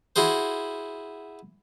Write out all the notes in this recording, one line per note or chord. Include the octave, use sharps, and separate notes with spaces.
E4 F#4 G#4 C5